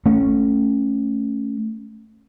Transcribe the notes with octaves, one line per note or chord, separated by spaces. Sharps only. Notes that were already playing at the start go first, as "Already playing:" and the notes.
A3 C#4